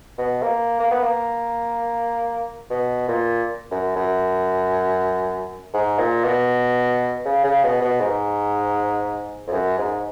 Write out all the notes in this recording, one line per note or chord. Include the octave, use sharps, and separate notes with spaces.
B2
A#3
A#3
B3
A#3
B2
A#2
F#2
F#2
G#2
A#2
B2
C#3
C#3
B2
B2
G#2
F2
F#2
G#2